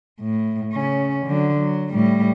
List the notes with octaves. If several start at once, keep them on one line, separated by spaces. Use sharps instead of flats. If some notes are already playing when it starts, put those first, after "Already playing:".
A2
C#3 C#4
D3 F#3
F#3
A2 G3